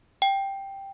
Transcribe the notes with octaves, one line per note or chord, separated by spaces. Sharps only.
G5